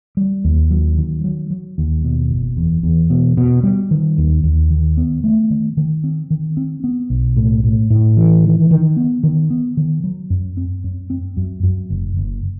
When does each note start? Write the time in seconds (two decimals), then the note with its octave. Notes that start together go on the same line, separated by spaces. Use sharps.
0.17 G3
0.44 D#2
0.71 F#3
0.98 D#3
1.24 F#3
1.50 F#3
1.78 D#2
2.04 B2
2.31 F#1
2.57 E2
2.83 E2
3.10 B2
3.37 B2
3.63 G3
3.91 D#3
4.18 D#2
4.44 D#2
4.71 D#3
4.97 B3
5.24 A3
5.50 D#3
5.77 D#3
6.04 C4
6.30 D#3
6.57 C4
6.84 B3
7.10 B1
7.37 A2
7.64 A2
7.90 A2
8.17 E3
8.44 D#3
8.71 D#3
8.96 B3
9.23 D#3
9.50 B3
9.77 D#3
10.04 F#3
10.30 F#2
10.57 C4
10.84 F#2
11.10 C4
11.37 F#2
11.63 F#2
11.90 F#1
12.17 F#1